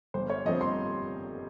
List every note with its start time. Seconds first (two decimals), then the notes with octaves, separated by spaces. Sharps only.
0.14 G1 C5
0.30 C#5
0.45 G2 F3 C4 D#5
0.61 C6